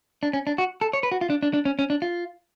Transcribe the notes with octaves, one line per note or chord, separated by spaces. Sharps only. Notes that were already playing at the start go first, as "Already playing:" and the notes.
D4
C#4
D4
F#4
A4
C#5
B4
F#4
F4
D4
D4
D4
C#4
C#4
D4
F4